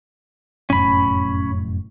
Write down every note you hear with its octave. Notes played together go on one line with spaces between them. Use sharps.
F1 F#2 A2 C#4 B5